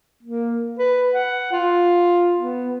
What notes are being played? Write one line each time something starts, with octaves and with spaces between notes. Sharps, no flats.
A#3
B4
F#5
F4
B3